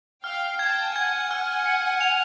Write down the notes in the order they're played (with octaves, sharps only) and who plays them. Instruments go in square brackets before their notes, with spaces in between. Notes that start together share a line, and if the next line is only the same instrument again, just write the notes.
[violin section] F5 G5 [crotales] F6
[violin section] G5 A5 [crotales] G#6
[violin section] F#5 G#5 [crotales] G#6
[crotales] F6
C#7
F7